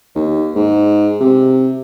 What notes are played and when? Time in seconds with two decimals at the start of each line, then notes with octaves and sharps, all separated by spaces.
0.15 D#2
0.55 G#2
1.20 C3